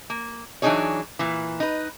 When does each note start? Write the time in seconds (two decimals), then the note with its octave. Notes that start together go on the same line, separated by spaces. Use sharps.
0.10 A#3
0.62 E3 F#3 D4 D#4 G#4 C#5
1.19 A#2 E3
1.60 D#4 B4